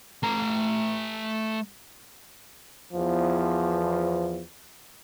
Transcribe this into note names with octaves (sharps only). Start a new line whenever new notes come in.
A3 A#5
E2 F3